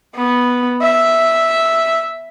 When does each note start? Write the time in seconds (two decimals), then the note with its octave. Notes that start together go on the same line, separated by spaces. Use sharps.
0.15 B3
0.82 E5